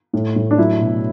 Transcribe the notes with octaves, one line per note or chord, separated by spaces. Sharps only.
A2
A2
D4
F#3 E4
B2